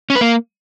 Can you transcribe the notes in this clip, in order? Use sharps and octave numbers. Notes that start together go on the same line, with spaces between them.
C#4
B4
A#3